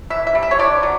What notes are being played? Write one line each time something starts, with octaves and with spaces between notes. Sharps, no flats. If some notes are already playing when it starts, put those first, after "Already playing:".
E3 E5
E5
G3
E5
C#5
D3 D5
F#3